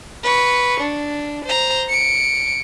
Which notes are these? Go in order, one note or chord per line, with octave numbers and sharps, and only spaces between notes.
B4 C#6
D4
C5 A#5
C#7 D7